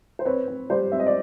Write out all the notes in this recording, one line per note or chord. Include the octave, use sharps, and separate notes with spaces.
C5
C4 B4 C#5
C4
G3 C5 D5
C4 E5
D#5
D5